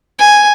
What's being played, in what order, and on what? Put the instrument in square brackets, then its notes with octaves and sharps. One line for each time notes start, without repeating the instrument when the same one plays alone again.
[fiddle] G#5